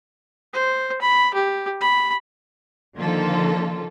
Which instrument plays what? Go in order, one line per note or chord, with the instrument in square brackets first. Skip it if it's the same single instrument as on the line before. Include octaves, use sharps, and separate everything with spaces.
[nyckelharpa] C5
B5
G4
B5
[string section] D3 D#3 F3 A#3 F4 A4